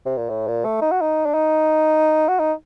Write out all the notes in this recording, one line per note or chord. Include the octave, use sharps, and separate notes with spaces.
C3
A#2
A2
A#2
A3
D#4
F#4
D#4
D4
D#4
F#4
D#4